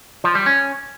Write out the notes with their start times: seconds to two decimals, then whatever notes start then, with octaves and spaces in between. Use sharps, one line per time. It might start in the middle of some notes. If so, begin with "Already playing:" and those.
0.24 F3
0.35 G3
0.46 C#4